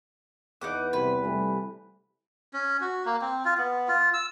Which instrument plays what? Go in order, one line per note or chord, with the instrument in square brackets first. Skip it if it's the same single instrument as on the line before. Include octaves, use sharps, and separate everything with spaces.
[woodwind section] E2 [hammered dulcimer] B3 [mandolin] D#4 F#5 D6
[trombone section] C2 C5 [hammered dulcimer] C3 [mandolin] B4
[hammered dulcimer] C3 E3 A3 [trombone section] G3
[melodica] C#4
F#4
A#3
C4
F4
B3
F4
E6